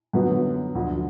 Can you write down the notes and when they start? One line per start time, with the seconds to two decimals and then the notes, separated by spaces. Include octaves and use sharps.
0.13 F#2 D3 F#3 B3
0.75 D2 D3 F3